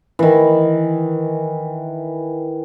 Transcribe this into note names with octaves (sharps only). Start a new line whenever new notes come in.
D#3 E3